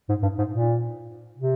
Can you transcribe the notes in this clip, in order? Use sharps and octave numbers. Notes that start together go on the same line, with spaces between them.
G#2
G2
G#2
A#2
C3